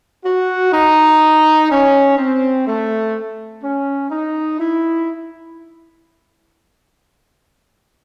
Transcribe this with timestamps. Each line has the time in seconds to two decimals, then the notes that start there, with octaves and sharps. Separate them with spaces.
0.24 F#4
0.72 D#4
1.70 C#4
2.17 C4
2.66 A3
3.62 C#4
4.10 D#4
4.60 E4